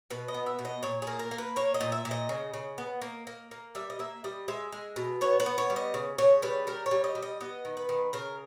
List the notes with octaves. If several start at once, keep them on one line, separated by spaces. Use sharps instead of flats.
B2 B4
D#5
B3
E5
B2
D#5
A#2 C#5
A#3 G#4
A#4
A#3
B4
A#3 C#5
D#5
A#2
E5
A#2
D#5
C#3
C#3
B3
A#3
A#3
A#3
G3 E5
D#5
A#3 E5
G3 D#5
G#3 E5
G#3
B2
B3 C#5
B4
B3
C#5
G3
D#5
C#3
C#3 C#5
G3 B4
G3 A#4
C#5
G3
D#5
G3
D#5
B3 D#5
D#3
B4
D#3
C#3 A#4